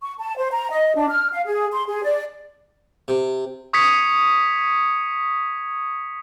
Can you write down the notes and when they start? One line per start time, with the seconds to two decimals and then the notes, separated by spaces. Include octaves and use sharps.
0.02 C#6
0.19 A5
0.38 C5
0.52 A#5
0.70 D#5
0.96 D4
1.10 F6
1.33 F5
1.46 G#4
1.72 C6
1.88 G#4
2.03 D5
3.08 C3
3.73 C#6 D#6 G#6 B6 C#7